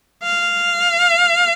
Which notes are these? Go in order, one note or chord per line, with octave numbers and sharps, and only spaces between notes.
F5